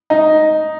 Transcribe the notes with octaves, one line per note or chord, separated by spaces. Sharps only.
D#4